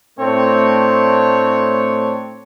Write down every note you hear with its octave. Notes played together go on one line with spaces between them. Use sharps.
A2 A3 C4 D4 C#5